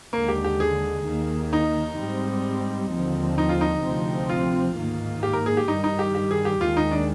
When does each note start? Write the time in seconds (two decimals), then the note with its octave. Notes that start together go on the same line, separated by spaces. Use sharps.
0.13 D#2 D3 G#3 A#3
0.28 G4
0.44 G4
0.60 G#4
1.06 D#2 D#3 A#3
1.53 D#4
1.99 G#2 G3 C4
2.91 D#2 D3 F3 C4
3.38 D#4
3.49 F4
3.61 D#4
3.83 D2 C3 F3 C4
4.29 F4
4.75 G#2 D#3 A#3
5.23 G4
5.33 A#4
5.46 G#4
5.57 G4
5.68 G2 D#3 G3 D#4
5.84 D#4
5.99 G4
6.15 G4
6.31 G#4
6.45 G4
6.61 D#2 D#3 G#3 F4
6.77 D#4
6.92 D4